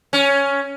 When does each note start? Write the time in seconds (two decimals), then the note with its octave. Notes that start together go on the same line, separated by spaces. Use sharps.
0.13 C#4